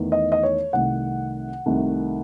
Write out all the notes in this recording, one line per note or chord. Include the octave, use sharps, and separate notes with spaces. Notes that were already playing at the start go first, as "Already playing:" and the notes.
Already playing: E2 D#3 A3
D#5
D#5
C#5
C2 C3 D#3 A3 F#5
C2 C3 D#3 A3